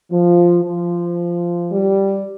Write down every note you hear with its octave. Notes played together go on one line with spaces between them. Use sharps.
F3
F3
G3